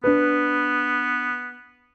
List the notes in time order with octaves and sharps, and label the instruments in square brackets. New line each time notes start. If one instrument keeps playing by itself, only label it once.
[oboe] B3 [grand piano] D4 B4